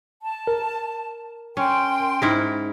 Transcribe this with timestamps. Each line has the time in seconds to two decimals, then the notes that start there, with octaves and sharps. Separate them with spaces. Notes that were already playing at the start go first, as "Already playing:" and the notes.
0.22 A5
0.47 A#4
1.57 C#4 G5 C6
2.22 G#2 E4 A#4